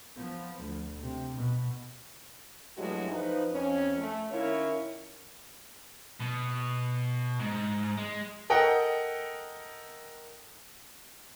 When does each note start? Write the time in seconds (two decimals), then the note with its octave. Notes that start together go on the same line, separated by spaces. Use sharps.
0.16 F3 B3
0.61 D2
1.00 C3
1.36 B2
2.77 G2 F#3 G#3 A3 E4 F#4
3.10 F3 D#4 B4
3.51 F2 C#4
3.97 A3
4.31 D#3 C#4 E4 F4 A#4 C#5
6.20 B2
7.39 G#2
7.97 G#3
8.50 A4 A#4 D#5 F#5 G5